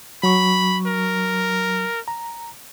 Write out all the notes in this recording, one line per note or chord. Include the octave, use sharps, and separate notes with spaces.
F#3 B5 C#6
A#4
A#5